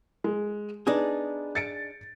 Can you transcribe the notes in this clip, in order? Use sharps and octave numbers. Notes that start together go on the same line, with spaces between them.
G#3
B3 D4 D#4 G#4
A6 C#7 D7